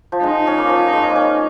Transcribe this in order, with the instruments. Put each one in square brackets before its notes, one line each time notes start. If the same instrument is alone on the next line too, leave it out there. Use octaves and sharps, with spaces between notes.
[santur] F3
[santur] G#3 [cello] D#4
[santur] C#4
A#3
F3
G#3
A#3
C#4